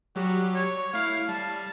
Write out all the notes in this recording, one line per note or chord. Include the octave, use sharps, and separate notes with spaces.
F#3 G3 F#4 G4
C#5
A3 E4 F5
G3 A5